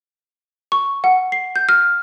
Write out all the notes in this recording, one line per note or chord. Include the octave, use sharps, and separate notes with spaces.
C#6
F#5
C7
G6
F6